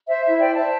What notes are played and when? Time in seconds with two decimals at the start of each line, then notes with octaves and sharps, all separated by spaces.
0.09 C5 E5
0.25 E4 E5
0.41 C5 D5 G5
0.56 C5 E5 A5